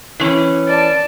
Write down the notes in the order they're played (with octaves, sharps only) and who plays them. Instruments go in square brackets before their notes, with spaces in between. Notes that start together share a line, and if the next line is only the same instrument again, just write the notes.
[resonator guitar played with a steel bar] E3 C#4
[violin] D5 A5